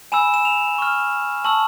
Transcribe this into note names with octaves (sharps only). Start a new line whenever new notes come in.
G#5 B5 E6 E7
E7
F7
C#6 F6
A5 C#6 E6 F#7